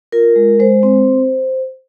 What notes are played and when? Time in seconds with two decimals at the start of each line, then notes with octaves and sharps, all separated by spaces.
0.12 F4 A#4
0.36 G#3
0.60 G#3 C5
0.83 C4